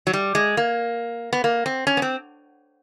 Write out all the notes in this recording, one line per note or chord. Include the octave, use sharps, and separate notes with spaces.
F#3
G3
G#3
A#3
B3
A#3
C4
C#4
B3
C4